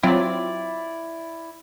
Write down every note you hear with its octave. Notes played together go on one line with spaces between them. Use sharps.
F#3 C4 E4 F4 D5